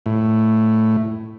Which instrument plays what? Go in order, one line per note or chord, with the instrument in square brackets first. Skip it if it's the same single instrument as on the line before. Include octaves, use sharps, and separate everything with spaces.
[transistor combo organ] A2